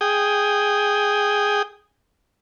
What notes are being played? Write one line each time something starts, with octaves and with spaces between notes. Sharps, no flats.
G#4 G5 D#6